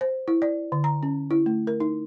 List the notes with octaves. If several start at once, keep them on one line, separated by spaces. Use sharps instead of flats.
C5
E4
D5
D3
A#5
C#4
E4
A3
A#4
D#4